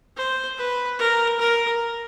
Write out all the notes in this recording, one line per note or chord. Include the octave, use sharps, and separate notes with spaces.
C5
B4
A#4
A#4